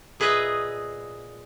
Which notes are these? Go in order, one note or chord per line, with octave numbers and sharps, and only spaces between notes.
A#2 G#4 B4 D#5 E5